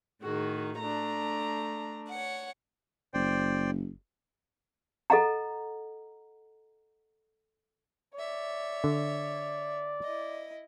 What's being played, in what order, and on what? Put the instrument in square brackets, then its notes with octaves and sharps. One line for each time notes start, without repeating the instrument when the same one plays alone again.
[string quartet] A2 D#3 [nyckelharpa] F#4 G#4
[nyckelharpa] A3 D4 [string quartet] A#5
[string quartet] C#5 F#5
[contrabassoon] F#1 [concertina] C5 D5 G5
[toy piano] A4 D#5 F#5 A#5
[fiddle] C#5 E5 [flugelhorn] D5
[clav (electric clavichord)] D3
[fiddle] E4 D#5